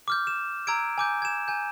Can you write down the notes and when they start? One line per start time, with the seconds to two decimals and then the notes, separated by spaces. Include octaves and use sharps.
0.08 D6 F6 G6
0.27 E7
0.67 A#5 E6 G#6 D7
0.98 G#5 D6 G6
1.22 G#6 E7
1.48 G#5 G6